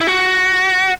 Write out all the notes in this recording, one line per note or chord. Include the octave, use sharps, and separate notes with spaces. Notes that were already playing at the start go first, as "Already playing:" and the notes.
E4
F#4